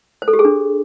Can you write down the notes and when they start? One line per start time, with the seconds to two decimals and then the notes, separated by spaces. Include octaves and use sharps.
0.22 C5
0.28 A4
0.33 G4
0.39 G#4
0.45 D4